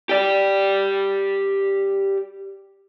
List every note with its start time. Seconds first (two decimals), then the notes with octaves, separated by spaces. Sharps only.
0.09 G4 D5